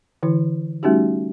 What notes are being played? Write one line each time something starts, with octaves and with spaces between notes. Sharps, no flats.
D3 E3 E4
G3 A3 C#4 D#4 F#4 G4